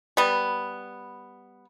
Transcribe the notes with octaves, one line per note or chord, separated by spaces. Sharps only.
G3 B3